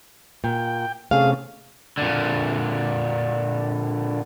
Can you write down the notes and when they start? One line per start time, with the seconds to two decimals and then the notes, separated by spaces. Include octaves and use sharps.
0.44 A#2 G5
1.11 C3 A3 C#4 G#4 F5
1.98 A#2 D3